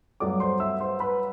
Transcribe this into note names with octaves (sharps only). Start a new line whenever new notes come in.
G2 F#3 A3 D5 D6
C5 C6
E5 E6
C5 C6
B4 B5